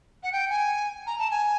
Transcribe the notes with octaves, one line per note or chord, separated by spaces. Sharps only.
F#5
G5
G#5
A#5
A5
G#5